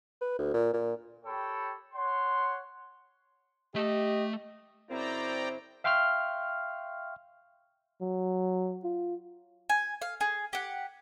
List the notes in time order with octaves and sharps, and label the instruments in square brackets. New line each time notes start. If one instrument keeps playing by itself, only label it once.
[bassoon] B4
D2
A#2
A#2
[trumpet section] G4 A4 C#5 G5 B5
C#5 F#5 C6
[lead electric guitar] A3 E5 [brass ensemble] G4 [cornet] D#5
[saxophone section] F#2 C#3 C4 [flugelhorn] E4 [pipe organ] D5 G5 A#5
[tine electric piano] E5 F5 G5 C6 C#6 F6
[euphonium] F#3
F4
[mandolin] G#5
F5
G#4
G4 F#5